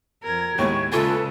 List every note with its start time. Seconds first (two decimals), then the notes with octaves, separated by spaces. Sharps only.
0.23 F2 A#4 G#6
0.58 D#2 A2 G#3 B3 C#6
0.92 C#3 G#3 F4 A4 B4 G#5 C#6